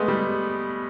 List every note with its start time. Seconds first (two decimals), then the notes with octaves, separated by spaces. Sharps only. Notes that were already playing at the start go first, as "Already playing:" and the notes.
Already playing: G#3 A3 B3
0.08 G3